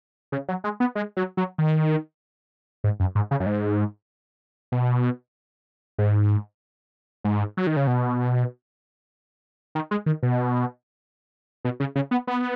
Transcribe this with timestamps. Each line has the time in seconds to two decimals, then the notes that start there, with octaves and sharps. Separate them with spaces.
0.32 C#3
0.48 F#3
0.64 G#3
0.80 B3
0.95 G#3
1.17 F#3
1.37 F#3
1.58 D#3
2.84 G#2
3.00 F#2
3.15 G#2
3.31 C#3
3.40 F#2
3.46 G#2
4.72 B2
5.98 G#2
7.24 G#2
7.57 F#3
7.67 D#3
7.77 C#3
7.87 B2
9.75 D#3
9.91 G#3
10.06 D#3
10.23 B2
11.65 B2
11.80 C#3
11.95 C#3
12.11 B3
12.27 B3